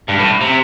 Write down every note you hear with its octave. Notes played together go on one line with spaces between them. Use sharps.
G2
A2
C3